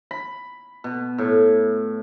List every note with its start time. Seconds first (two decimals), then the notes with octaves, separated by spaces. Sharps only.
0.11 B5
0.84 B2
1.18 A2